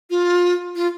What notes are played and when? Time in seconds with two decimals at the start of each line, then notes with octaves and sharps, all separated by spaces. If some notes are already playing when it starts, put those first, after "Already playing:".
0.10 F4
0.76 F4